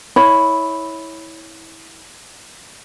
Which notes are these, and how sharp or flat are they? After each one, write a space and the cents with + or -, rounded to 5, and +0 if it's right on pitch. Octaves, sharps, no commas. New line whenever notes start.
E4 -20 C#5 +0 B5 +0